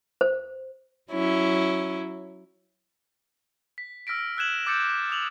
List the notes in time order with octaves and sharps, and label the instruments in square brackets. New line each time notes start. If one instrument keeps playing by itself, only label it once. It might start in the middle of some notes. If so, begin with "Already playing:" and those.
[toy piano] C5
[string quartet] F#3 C#4 E4
[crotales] B6
E6 F6 A#6 B6 D7
E6 F#6 G#6 E7 F#7
D6 E6 G6 A6 C#7 E7
D6 D#6 F7 F#7